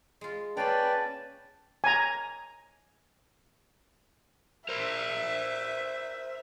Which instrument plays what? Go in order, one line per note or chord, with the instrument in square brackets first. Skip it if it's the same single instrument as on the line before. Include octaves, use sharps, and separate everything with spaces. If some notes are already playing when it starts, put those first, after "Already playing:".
[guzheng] G#3 F4
[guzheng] A#3 G#4 B5 [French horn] C#4 [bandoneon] B4 D5 G5 [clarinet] A5
[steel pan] G#5 A#5
[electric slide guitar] A#4 C5 [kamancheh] E5